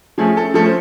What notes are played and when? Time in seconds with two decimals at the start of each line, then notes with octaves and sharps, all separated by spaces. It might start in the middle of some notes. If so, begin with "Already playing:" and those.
0.18 F3 A3 C#4 G#4
0.37 A4
0.54 F3 A3 C#4 A4
0.65 C5